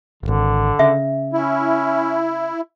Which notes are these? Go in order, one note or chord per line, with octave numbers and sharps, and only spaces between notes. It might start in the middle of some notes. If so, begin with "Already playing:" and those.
D1 G#1 D3
C#3 E5
C#4 E4